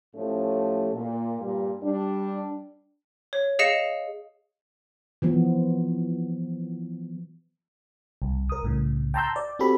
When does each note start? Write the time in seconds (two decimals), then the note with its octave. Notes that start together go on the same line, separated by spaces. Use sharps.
0.15 A2 F3 A3 C#4 G4
0.92 A#2
1.40 G2 A#2 G3
1.83 G3 D4
3.33 C#5
3.59 G#4 D#5 F5 A#6 C#7 E7
5.22 E3 F3 B3
8.22 C2
8.50 A#4 D#6
8.63 C2 A2 C#3
9.14 G5 A5 A#5 C6 E6 G6
9.36 D5
9.59 C4 F#4 G4 A4 B5